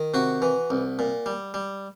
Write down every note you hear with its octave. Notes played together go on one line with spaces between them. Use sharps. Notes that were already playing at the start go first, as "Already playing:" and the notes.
Already playing: D#3
C3 F#4
E3
C2
A#2
G3
G3